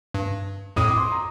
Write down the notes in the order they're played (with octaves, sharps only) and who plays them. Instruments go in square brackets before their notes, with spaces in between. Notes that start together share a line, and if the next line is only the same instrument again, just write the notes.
[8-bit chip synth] G2
[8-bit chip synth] F2 A2 [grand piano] D#6
[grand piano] D6
C6
A#5